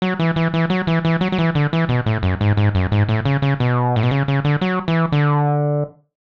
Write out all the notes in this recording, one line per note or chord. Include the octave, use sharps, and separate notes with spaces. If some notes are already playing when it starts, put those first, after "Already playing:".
F#3
E3
E3
E3
F#3
E3
E3
F#3
F#3
E3
D3
E3
B2
A2
F#2
G#2
G#2
F#2
G#2
A2
C#3
C#3
B2
A2
B2
C#3
C#3
D3
F#3
E3
D3